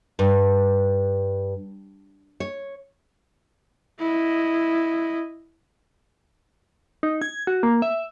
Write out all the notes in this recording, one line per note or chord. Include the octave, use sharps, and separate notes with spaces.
G2
C#5
E4 D#5
D#4
G#6
F#4
A#3
E5